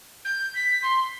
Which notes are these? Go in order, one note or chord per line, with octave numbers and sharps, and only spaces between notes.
G6
B6
C6